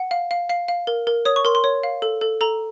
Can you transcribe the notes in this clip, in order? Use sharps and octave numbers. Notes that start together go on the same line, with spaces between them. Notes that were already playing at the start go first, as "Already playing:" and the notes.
Already playing: F#5
F5
F5
F5 C7
F5
A#4
A#4
C#5 D#6
C#6
A#4 C6
C6
C#5
F5
A4
A4
A4 A#5